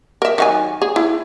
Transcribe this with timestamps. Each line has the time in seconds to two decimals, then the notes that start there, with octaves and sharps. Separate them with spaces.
0.22 A#4 E5
0.38 D#3 F#3 G#5
0.82 G#4
0.96 E4